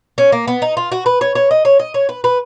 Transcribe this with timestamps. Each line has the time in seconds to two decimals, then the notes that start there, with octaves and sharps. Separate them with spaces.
0.18 C#4
0.32 A#3
0.48 B3
0.62 D#4
0.77 F4
0.92 F#4
1.06 B4
1.21 C#5
1.35 C#5
1.51 D#5
1.65 C#5
1.79 D#5
1.94 C#5
2.09 B4
2.24 B4